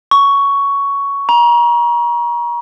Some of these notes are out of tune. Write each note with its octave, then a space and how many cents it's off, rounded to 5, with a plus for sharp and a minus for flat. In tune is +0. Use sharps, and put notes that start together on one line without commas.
C#6 +10
A#5 +35